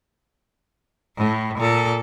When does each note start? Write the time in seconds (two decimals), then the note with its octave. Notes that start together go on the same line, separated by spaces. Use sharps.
1.17 A2
1.59 A#2 A4